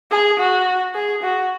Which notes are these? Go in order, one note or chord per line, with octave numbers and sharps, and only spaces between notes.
G#4
F#4
G#4
F#4